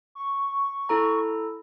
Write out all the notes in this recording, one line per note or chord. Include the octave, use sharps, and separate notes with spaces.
C#6
E4 A4 A#5